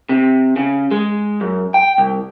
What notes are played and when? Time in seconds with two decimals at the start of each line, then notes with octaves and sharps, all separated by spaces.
0.09 C3
0.56 C#3
0.91 G#3
1.41 F#2
1.74 G5
1.98 C2